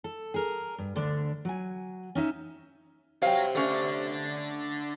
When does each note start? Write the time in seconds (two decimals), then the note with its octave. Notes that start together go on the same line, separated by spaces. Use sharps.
0.04 A4
0.34 G#4 A#4
0.78 G2
0.96 D2 D3 D4
1.45 F#3 G#5
2.15 C#4 D#4 E5
3.22 C3 F#4 C#5 F5 G5
3.55 D3 A3 C#4 D4